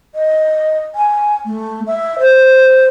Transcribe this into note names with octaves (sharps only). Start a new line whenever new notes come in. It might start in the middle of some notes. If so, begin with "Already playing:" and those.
D#5
G#5
A3
E5
C5